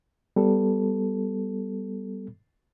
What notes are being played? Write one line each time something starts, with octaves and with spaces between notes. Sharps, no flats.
G3 B3 A4